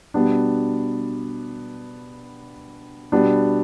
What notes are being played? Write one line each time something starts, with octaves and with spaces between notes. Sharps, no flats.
B2 G3 B3 D4
B2 G3 B3 D4